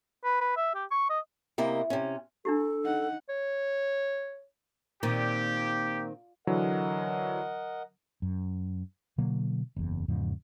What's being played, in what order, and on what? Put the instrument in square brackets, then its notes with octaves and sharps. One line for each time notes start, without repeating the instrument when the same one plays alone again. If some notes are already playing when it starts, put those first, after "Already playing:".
[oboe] B4
B4
E5
G4
C#6
D#5
[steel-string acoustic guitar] C3 A#3 E4 D#5
C3 C#4
[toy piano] D4 E4 G4 [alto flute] A4
[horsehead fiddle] D#4 F#5
[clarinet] C#5
[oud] A#2 [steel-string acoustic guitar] D#3 C4 [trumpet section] G4
[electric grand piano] D3 E3 F#3 [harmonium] A#4 D#5 F#5
[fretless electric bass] F#2
B2 D3 F#3 A#3
F#1 E2
E2 G#2 C#3 F3